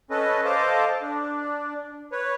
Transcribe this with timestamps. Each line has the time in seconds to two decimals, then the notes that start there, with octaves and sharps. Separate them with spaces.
0.11 C#4 A4 B4 D#5
0.45 A4 C5 D#5 F5 A5 D6
1.02 D4
2.12 B4 C#5